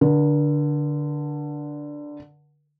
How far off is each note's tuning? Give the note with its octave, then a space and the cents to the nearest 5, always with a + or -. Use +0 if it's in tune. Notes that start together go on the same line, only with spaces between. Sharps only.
D3 +0 A#4 +45